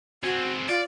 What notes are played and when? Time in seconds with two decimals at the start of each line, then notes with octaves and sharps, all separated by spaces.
0.23 C4 F#4 G#4
0.69 F4 D5